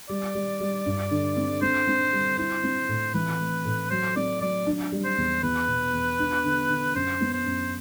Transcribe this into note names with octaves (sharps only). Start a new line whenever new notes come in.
G3 D5
G3
G3
G2
D3
C4
C4 C5
C4
G3
E4 C5
C4
A2
E3 B4
A3
A2
F#3 C5
C4 D5
F#3 D5
D4
G3
C5
E2
E2 B4
B2
E2
D4
D3
D3
F#2 C5
B3
C5
F#2